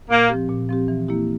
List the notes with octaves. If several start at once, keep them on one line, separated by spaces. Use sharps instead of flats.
A#2 A#3
F3 C4 G4
A#2
F3 C4 G4
E3
A#3 E4 G4